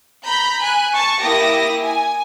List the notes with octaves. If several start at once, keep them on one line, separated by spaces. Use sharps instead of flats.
A#5 B5 G6
G#5 F#6
A5 C#6
A#3 E4 G4 D#6 A#6
G#5